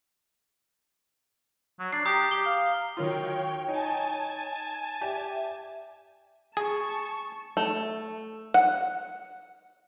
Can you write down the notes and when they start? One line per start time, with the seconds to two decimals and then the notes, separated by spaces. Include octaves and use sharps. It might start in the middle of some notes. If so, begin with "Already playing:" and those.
1.79 F#3
1.93 D4 C7
2.06 G4 A#5 D#6
2.31 G4 G7
2.46 F5
2.97 D#3 F#3 F4 C#5 G5
3.68 D#4 G#5 A5
5.01 G4 D5 E5
6.57 G#4 A5 C#6
7.57 A3
8.54 F#5